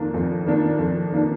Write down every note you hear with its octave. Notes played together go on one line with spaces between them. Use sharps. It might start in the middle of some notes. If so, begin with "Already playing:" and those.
Already playing: F2 D#3 A#3 D4
F2
D#3 A#3 D4
F2
D#3 A#3 D4